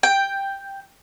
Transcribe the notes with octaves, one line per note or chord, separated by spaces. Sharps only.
G5